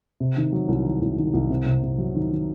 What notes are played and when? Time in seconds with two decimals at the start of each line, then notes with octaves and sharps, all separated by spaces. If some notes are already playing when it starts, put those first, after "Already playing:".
0.20 C3
0.37 D#3
0.53 F#3
0.68 C2
0.85 D#3
1.01 C2
1.18 D#3
1.34 C2
1.50 C3
1.66 C3
1.83 C3
1.98 F#3
2.15 D#3
2.32 D#3